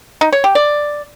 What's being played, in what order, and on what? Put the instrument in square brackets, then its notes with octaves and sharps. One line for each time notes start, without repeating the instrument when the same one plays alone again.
[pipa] D#4
C#5
G4
D5